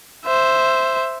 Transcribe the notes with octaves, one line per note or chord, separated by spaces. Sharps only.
C5 E5